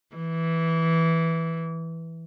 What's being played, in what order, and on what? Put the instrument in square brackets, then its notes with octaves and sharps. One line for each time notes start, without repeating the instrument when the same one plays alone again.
[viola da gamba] E3